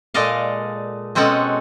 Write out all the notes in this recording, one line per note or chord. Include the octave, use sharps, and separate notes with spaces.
A#2 G#3 A4 D5 D#5 F5
B2 G#3 C4 C#4 A4 F#5